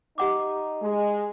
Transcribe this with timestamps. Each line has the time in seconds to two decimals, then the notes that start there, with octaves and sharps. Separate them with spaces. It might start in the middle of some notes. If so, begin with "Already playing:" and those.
0.18 D#4 G4 F#5 D6
0.81 G#3